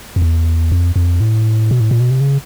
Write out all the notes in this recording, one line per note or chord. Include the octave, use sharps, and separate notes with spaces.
F2
E2
F2
F2
A2
B2
A2
A#2
B2
C3
C#3